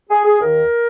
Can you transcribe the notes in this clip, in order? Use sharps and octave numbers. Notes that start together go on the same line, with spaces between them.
G#4
G#4
D#2 D#3 A#4